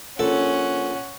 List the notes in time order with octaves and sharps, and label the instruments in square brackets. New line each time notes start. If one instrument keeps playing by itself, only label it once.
[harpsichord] A#1 A4 [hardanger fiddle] C#4 F#5